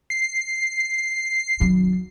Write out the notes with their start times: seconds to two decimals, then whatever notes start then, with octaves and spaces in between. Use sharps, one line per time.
0.10 C7
1.60 D#3 F#3